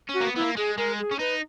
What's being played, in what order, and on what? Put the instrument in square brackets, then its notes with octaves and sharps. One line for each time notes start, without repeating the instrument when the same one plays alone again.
[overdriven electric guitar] C#4
[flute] F#4
[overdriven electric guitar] A#3
B3
[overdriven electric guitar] B3 [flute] E4
[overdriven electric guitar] A#3
[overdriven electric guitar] G#3 [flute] G#4
[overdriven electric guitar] G#3 [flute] A#4
[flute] G#4
[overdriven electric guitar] C#4
[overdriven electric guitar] D#4 [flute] B4